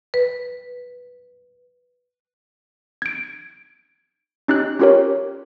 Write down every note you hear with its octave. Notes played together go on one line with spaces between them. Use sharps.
B4
G#6 D7
C#4 D#4 G4 F#6
C#4 F4 G4 A#4 C#5